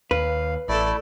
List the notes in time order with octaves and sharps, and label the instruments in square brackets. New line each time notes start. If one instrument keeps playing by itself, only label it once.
[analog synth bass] D#2 [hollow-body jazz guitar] B4 [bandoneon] F5
[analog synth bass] A1 [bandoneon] A3 E4 [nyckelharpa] A4 D5